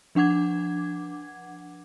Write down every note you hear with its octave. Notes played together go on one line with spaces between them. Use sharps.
F3 D4 F#5 D6 G#6